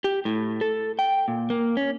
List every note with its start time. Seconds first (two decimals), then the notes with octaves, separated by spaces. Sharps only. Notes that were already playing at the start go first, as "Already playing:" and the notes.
0.04 G4
0.25 A2
0.61 A4
0.99 G5
1.28 A#2
1.50 A#3
1.77 C#4